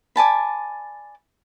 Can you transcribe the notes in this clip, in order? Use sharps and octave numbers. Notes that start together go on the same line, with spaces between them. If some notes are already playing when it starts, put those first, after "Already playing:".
D5 G#5 A5 B5